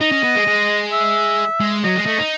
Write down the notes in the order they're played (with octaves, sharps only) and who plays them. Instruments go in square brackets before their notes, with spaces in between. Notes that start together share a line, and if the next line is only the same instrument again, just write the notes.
[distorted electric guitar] D#4 [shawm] D#5
[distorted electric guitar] C#4
B3
G#3
G#3
[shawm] E5
[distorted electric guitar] G#3
[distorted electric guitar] F#3 [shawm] D#5
[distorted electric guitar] G#3
A3
D#4